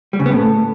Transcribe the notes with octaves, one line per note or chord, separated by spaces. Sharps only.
G3
C#3
B3
A2